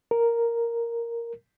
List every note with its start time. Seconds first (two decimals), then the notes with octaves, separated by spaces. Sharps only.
0.11 A#4